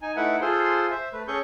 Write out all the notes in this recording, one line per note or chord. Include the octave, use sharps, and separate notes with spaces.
D#4 G#5
A3 D#4 E4 B4 E5 F#5
F4 G#4 A4 C5 C6
C5 E5
A3 B4
C#4 G#4 A4 C#6 G6